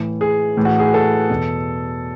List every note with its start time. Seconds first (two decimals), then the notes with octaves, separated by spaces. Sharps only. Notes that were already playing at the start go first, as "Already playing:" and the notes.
Already playing: A2 E3
0.21 G#4
0.57 A2 E3
0.65 F#4
0.79 G#4
0.94 A4
1.29 E2 B2